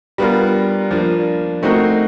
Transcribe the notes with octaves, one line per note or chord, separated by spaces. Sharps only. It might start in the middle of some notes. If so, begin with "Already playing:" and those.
G3 B3 D4 F4 A#4
F3 A#3 D4
A3 C4 D#4 F#4 A#4